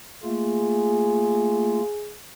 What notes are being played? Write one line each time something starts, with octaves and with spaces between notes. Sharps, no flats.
A3 A#3 F4 G#4